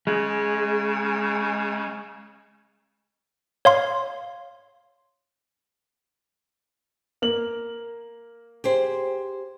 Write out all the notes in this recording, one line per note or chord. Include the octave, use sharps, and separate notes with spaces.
C#3 G#3
C#5 F5 C6
A#3 A#4 F#7
G4 G#4 C5